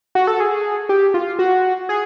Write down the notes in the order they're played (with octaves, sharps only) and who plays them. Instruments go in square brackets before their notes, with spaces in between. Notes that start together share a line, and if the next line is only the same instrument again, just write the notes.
[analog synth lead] F#4
A4
G#4
G4
F4
F#4
G#4